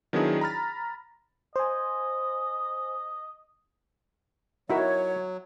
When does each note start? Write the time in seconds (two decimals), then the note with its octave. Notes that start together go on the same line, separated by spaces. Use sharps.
0.13 D#3 F#3 B3 D4 E4 G#4
0.41 A#5 B5 F6 A6
1.56 C5 D#5 G#5
4.70 F#3 D#4 E4 F#4 A#4 C#5 E5